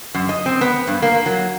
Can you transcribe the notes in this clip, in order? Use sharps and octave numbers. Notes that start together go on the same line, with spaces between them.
F#2
D#5
C4
B3
G2
A#3
F#3